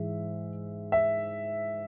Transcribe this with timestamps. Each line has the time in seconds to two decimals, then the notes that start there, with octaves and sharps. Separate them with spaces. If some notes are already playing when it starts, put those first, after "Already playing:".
Already playing: G#2 E3 G#3 E5
0.92 E5